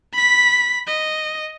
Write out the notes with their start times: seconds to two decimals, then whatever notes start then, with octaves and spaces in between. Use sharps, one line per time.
0.13 B5 B6
0.87 D#5